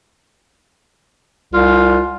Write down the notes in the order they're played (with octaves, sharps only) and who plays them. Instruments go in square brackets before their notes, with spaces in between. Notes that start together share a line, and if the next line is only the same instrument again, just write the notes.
[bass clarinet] C2 [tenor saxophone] F4